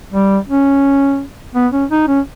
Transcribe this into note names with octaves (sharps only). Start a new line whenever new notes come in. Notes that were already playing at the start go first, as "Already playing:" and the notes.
G3
C#4
B3
C#4
D#4
C#4